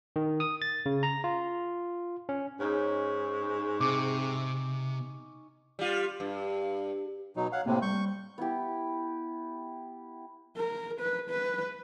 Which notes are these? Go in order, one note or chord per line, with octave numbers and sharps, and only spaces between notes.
D#3
D#6
A6
C#3
A#5
F4
C#4
G#2 C#4 D#4
C3 D6
G3 F4
G2
B2 F#3 D#4
C#5 F5 F#5
A2 C3 A#3
G3 C#6 G6
B3 E4 G4
A#4
B4
B4